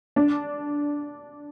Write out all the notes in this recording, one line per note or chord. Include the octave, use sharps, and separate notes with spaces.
D4